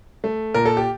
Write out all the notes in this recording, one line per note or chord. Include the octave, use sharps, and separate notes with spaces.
A3
A#2 A#4
A4
G4